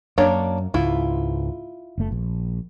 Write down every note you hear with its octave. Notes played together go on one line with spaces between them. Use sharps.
F#2 A#3 D4 C#5
C#2 G#2 E4 F4
F#1 A3
A#1